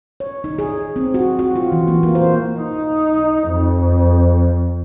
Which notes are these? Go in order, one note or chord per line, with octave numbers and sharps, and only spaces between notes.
C#5
D#4
G#4
C4
F#4
F#4
F4
E3
A#3
A#3
C5
D#4
F2